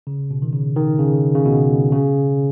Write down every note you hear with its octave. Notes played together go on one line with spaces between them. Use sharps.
C#3
B2
D#3
C#3
D#3
C#3
C#3
B2
C#3